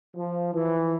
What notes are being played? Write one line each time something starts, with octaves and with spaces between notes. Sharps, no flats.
F3
E3